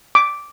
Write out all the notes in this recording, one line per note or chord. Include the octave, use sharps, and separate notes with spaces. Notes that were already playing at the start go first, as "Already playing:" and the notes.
D6